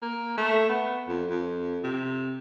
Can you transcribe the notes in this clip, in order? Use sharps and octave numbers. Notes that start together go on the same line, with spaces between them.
A#3
A3
B3
F2
F2
C3